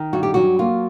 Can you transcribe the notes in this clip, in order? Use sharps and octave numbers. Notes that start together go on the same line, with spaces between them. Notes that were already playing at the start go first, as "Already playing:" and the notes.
Already playing: D#3
G2 F#4
G4
F#3 F#4
A#3 F4